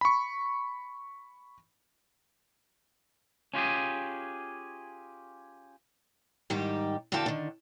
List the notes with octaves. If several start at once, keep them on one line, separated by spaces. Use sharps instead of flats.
B5 C#6
C#4 F4 G4 G#4
G#2 D#3 G3 D#4 G4
E2 D3 F#4 F5 G5 A5
D3 D#3